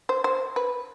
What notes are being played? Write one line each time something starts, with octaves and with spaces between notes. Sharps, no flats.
C5
C5
B4